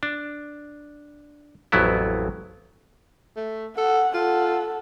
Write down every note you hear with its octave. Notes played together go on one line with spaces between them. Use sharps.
D4
A1 F2 F#3 B3 E4
A3
A4 F#5
F4 A4 F#5